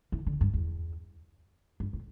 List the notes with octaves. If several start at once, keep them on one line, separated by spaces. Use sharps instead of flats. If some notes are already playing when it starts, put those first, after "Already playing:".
E3
D3
G2
E2
G2
A2